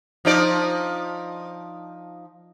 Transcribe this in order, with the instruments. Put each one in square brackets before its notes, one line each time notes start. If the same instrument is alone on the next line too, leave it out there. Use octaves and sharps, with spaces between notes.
[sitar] F3 D#4 D5